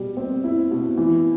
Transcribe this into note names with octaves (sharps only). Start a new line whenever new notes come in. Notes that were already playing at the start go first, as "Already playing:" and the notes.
Already playing: B2 G3
C4
E4
B2
E3